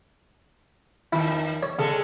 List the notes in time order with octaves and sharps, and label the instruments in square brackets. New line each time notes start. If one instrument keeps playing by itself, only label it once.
[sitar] E2 D#3 [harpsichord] E4
[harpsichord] C#5
[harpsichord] C#3 [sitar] G3 G#3 A4